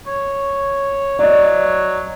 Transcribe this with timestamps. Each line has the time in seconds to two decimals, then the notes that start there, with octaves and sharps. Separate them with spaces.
0.07 C#5
1.19 F#3 D5 D#5